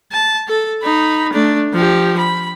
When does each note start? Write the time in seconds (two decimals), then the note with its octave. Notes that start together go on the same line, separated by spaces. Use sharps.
0.12 A5
0.48 A4
0.82 D#4 B5
1.33 A3 D4
1.73 F3 G4
2.19 B5